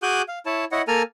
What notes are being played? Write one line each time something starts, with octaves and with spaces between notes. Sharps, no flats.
F#4 G#4 G#5 D6 F#6 G6
F5
E4 C#5 A5
E4 C#5 D#5 F#5
A#3 A4 G#5 A#5 F6